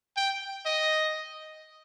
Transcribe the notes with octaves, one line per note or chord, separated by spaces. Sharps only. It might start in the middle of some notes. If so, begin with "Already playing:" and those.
G5
D#5